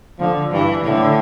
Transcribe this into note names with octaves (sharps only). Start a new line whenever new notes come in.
D3 F3
G2 E3
A2 D3